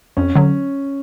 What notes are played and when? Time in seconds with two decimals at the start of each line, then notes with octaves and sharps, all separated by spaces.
0.17 F2 C#4
0.36 D3 F#3